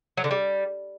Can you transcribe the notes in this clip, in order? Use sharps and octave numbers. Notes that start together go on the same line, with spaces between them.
F#3
D3
G3